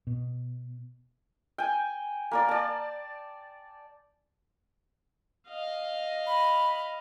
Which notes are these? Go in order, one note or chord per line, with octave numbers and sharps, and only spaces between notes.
B2
G5 G#5
A#3 A#4 D5
D5 A5
D#5 F5
B5